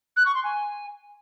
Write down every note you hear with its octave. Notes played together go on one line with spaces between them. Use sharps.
F#6
C#6
C6
G#5